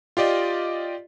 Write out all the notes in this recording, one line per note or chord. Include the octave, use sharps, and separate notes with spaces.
F4 G4 D5 D#5